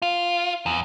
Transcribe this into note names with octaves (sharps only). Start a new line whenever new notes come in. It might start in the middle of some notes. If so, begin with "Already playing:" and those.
F4
E2